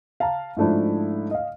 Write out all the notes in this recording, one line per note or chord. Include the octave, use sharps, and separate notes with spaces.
F5 A5 A#5
G#2 F3 A3 D4 E4
D#5 F5